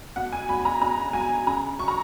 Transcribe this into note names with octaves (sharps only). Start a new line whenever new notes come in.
B2 F#5
G#5
F#3 B5
A#5
B2 A#5
F#3 G#5
C#3 A#5
F#3 C#6
A#5